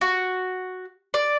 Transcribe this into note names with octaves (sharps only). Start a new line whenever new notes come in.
F#4
D5